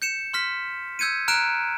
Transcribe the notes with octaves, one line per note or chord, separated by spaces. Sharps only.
G6 C#7 E7
C6 F6 B6
E6 G6 G#6 C#7 D#7
A#5 F6 F#6 D7 E7